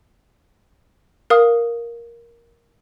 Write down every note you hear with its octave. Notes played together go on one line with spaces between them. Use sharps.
A#4 F5 D#6